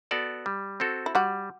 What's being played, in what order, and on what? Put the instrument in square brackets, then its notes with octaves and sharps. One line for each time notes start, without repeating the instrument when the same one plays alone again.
[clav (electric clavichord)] B3 F#4 A4 D5
G3
C4 F#4 A4
[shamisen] E4
[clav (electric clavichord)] G3 [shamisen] F#4